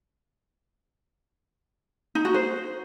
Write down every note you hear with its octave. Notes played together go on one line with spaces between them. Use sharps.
D#4
F#4
C5